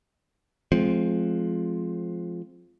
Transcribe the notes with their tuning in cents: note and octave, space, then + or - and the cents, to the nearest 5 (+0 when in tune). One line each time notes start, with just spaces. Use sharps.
F3 +0 G#3 +35 C4 +0